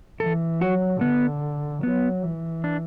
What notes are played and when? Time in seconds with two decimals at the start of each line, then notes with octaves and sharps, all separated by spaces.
0.20 E3 A4
0.60 F#3 F#4
1.01 D3 B3
1.83 F#3 B3
2.23 E3
2.64 D4